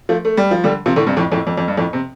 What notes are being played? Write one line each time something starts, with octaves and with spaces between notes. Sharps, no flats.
F3 A3
A3
G3
F3
D3 G3
C3 F3
A2 D3
G2 C3
F2 A2
F2 A2
F2
F2
G2
F2 A2
C3